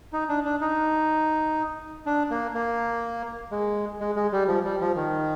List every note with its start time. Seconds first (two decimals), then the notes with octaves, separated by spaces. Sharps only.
0.13 D#4
0.29 D4
0.45 D4
0.61 D#4
2.06 D4
2.30 A#3
2.55 A#3
3.51 G#3
4.00 G#3
4.16 G#3
4.32 G3
4.48 F3
4.65 G3
4.81 F3
4.96 D#3